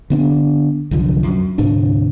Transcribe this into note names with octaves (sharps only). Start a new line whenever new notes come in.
D3 B3 D4
C2 F#2 D3 F3
F#2 F#3
D2 G#2 C3 D4